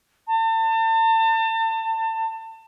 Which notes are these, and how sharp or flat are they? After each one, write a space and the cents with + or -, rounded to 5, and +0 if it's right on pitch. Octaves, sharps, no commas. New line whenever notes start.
A5 +35